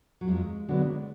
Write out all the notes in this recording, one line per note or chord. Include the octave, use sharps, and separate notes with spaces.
F#3
F2 G#3
D3 F#3 G#3 B3